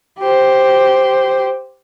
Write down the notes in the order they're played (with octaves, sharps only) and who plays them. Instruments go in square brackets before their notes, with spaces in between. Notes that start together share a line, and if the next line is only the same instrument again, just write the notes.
[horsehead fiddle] G4 C5